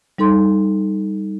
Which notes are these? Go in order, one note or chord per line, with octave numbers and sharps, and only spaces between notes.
G3 D#4 A4 C6